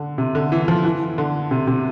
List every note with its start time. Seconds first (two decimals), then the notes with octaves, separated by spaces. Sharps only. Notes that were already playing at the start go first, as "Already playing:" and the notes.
Already playing: D3
0.18 C3
0.35 D3
0.52 E3
0.68 F3
0.84 E3
1.18 D3
1.51 C3
1.67 C3